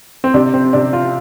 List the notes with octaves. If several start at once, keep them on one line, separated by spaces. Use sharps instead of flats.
C4
C3 D4
C4
C3 D4
F4